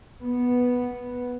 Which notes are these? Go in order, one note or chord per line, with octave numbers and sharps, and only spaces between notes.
B3